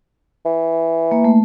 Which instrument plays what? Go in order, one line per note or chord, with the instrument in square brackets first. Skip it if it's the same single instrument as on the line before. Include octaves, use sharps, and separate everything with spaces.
[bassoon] E3
[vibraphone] A#3
A3